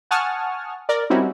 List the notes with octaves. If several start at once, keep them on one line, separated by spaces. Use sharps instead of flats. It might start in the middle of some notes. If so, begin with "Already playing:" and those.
F#5 G#5 A5 C#6 D#6 F6
A#4 D5
G3 C4 C#4 D#4 E4 F#4